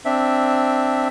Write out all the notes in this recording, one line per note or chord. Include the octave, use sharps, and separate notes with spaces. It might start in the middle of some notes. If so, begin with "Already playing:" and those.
C4 D4 E5